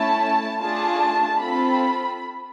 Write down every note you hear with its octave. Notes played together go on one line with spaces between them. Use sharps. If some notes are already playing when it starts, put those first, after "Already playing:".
Already playing: A3 C#4 E4 A5
A3 D4 F4 G#4 A5
C4 F4 A4 B5